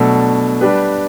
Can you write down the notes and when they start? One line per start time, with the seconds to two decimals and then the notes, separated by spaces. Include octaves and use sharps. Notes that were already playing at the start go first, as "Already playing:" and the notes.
Already playing: B2 F#3 A3 D4 A4
0.61 G3 D4 G4 B4